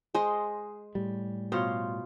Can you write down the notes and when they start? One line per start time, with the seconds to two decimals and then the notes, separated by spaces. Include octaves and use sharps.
0.14 G#3 C5 D#5
0.95 A2 G3
1.52 B2 F4 C5 C#5